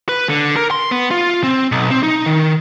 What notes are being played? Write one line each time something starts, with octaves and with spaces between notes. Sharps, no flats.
B4
D3
A#4
C6
B3
F4
C4
B1
C4
D#4
D#3